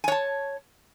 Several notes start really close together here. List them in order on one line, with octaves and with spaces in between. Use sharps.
G#5 C#5 A5